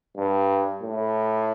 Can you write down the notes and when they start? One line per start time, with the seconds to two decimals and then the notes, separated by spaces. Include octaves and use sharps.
0.17 G2
0.82 A2